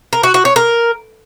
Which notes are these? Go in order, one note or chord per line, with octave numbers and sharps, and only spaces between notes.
A#4
F#4
F#4
C#5
A#4